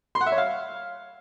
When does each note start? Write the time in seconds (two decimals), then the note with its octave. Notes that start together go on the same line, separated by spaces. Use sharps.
0.15 C6
0.21 F#5
0.26 E5
0.32 C#5
0.38 F5